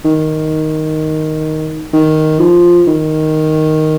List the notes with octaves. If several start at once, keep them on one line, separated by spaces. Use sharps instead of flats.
D#3
D#3
F3
D#3